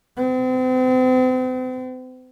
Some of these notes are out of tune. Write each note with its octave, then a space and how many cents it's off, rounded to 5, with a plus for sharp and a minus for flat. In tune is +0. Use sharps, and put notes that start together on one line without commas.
C4 -40